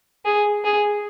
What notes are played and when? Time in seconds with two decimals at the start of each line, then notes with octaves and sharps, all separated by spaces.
0.25 G#4
0.64 G#4